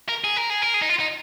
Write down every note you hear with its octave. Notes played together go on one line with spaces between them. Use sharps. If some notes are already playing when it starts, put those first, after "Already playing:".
A#4
G#4
A#4
G#4
A#4
G#4
D#4
F4
D#4